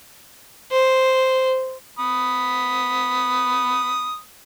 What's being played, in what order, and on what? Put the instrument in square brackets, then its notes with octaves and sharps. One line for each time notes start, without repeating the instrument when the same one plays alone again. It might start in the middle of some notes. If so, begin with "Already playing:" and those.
[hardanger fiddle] C5
[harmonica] B5 D#6